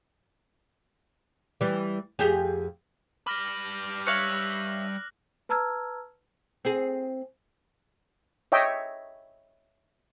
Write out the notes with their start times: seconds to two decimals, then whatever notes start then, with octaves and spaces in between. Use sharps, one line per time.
1.61 E3 G3
2.19 F2 G4 G#4
3.27 G3 B4 D6 F6 A#6
4.07 C#5 E5 F5 F#6 A#6 F#7
5.49 B4 A5 A#5 E6 F6 G#6
6.65 C4 G#4
8.52 C#5 D#5 E5 G5